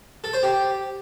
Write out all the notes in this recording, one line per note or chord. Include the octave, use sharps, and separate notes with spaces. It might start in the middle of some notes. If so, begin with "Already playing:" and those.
A4
C5
G4